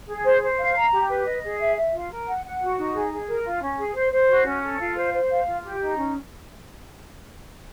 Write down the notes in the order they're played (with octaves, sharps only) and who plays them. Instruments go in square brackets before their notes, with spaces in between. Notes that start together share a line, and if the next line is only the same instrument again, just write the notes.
[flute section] G#4
C5
C5
F5
A#5
G4
B4
D#5
G#4
E5
E5
F4
A#4
F#5
F#5
F#4
D#4
G#4
G#4
A#4
F4
C#4
G#4
C5
C5
F#4
C#4
A4
F4
C5
C5
F5
F4
G4
D#4
C#4